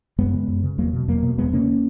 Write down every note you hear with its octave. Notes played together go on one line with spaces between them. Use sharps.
F#2 G#3 B3
C#3
F#2
C#3
E2 F#3 A#3
B2
E2 F#3 A#3
B2
E2 G#3 B3
C#3 A#3 C#4